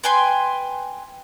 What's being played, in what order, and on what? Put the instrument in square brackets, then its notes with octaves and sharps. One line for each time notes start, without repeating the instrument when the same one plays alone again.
[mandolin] B4 G5 G#5 C6